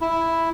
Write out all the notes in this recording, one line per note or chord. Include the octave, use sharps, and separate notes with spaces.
E4